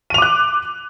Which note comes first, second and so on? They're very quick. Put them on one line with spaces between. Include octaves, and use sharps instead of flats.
D#7 F7 D6 F#6